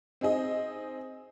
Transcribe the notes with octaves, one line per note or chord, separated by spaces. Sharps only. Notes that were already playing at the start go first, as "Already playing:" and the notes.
C4 D#4 G#4 D#5